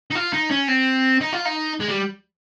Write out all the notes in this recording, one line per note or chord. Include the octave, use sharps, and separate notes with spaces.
D#4
F4
D#4
C#4
C4
D#4
F4
D#4
G#3
G3